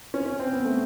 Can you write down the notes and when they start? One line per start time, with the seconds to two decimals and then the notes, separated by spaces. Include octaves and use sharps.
0.14 C#4
0.26 C#4
0.40 C4
0.52 B3
0.65 A3